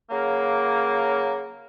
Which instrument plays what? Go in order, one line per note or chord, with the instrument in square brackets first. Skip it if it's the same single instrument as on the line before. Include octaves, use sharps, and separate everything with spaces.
[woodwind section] C#3 F#3 A#3